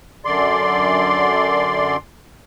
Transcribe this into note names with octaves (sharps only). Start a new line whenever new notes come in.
F#2 D3 D5 C6